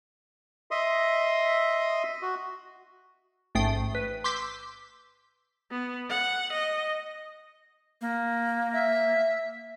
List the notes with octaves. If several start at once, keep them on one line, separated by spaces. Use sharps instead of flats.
D#5 E5 C6 D#6
F#4
A1 G#2 A3 G5 D#6 C7
B4
C6 D6 E6 G6 B6
B3
F#5
D#5
A#3
E5